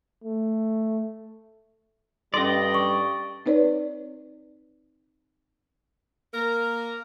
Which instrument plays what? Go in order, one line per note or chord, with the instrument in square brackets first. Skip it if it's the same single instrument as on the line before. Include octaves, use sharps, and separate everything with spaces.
[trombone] A3
[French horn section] G2 G3 [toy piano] C#4 A4 C6 [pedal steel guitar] D5 D#5
[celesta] C#6
[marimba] C4 D#4 B4 C#5 D5
[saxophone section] A#3 A#4